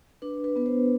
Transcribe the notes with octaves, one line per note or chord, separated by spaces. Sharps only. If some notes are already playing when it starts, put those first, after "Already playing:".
D4 B4
B4
B3 B4
C5